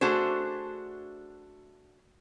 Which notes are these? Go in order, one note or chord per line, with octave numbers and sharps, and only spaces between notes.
A3 D4 F#4 G#4 C5